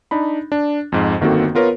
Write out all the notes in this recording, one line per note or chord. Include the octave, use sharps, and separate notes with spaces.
D4 D#4 B5
D4
F2 G#2
G1 D#3 A#3 C4 F#4 A4
B3 F4 A#4 B4 C#5